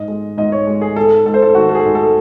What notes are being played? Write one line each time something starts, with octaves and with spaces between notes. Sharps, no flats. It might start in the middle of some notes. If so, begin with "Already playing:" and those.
Already playing: G#2 D#5
G#3
G#2 D#5
C#5
G#3
G#4
G#2 A4
G#2 A4
C5
A4
D#3 F#4
A4
G#4
G#2
A4